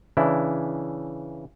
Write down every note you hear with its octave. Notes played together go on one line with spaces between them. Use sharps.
C#3 E3 D4 E4